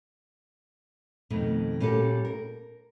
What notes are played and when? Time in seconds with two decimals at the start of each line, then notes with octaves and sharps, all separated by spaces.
1.30 F2 B2 D#3 A3
1.80 A#2 G3 C#4 F#4 A4
2.25 A#4